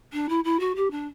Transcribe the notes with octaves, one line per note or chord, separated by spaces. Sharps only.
D4
E4
E4
F#4
G4
D4